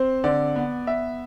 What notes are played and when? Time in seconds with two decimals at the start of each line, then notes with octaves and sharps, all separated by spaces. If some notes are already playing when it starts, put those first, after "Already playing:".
Already playing: C4 C5
0.24 D3 D5
0.56 B3
0.87 B3 E5